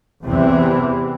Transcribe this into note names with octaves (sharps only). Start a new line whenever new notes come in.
E2 C3 E3